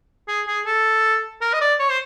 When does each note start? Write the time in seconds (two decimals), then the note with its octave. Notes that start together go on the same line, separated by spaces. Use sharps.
0.28 G#4
0.47 G#4
0.66 A4
1.41 A#4
1.54 D#5
1.61 D5
1.80 C#5
1.89 C5